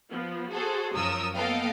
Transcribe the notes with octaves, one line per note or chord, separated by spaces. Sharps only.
F3 B3
F#4 G#4 A4 C5
F#2 F3 A#4 C#5 D#6 E6
A#3 B3 A4 D#5 F5 G5